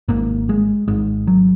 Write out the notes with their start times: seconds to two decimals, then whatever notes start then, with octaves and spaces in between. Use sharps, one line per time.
0.08 G#1 G#2 A#3
0.49 G#3
0.88 G#1 G#2 G#3
1.27 F#3